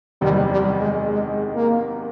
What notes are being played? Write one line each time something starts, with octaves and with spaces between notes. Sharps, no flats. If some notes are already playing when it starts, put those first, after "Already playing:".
F#1 E2 C3 D#3 G3
G3
G#3
G#3
A#3